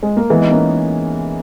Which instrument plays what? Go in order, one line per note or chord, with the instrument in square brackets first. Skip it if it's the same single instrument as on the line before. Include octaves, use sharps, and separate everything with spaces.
[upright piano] G#3
A#3
[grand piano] E3 [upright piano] G#3 B3
[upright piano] D#4
A#3 C#4